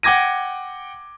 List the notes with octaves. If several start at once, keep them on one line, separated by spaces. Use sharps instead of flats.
F#5 G5 D6 G#6 A#6 D#7